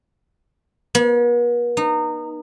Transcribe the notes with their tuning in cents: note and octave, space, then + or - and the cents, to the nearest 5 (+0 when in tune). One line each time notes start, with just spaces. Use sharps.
B3 -45
D#4 -25